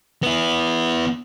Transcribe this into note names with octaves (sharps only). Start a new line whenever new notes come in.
B3 E4